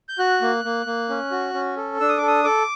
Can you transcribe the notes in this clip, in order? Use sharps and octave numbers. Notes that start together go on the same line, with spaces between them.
G6
F#4 F#6
A#3
A#3
A#3
C#4
F#4
C#4
A4
D4 E6
D#6
D6
A4
D#6
A4 D6